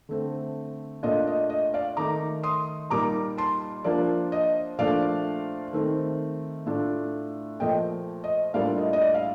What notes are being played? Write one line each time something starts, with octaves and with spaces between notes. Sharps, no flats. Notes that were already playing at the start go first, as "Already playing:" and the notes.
D3 A3 C4
A#2 A3 D4 F4 D#5
D#5
D#5
D5 F5
D#3 A3 D#4 A#5 D6
C6 D#6
A#2 G3 A#3 D#4 A#5 D6
A5 C6
F3 A#3 D4 F4 D5
D#5
A#2 F3 A3 D4 D5 F5
D#3 A3 C4
A2 A3 D4 F4
A#2 F3 A3 D#5 G5
D#5
A2 G3 A#3 D4 F4 D5 F5
D#5
D#5
D5
F5